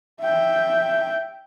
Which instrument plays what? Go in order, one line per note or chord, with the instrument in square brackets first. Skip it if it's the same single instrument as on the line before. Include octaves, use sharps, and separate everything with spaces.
[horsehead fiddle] E5 G5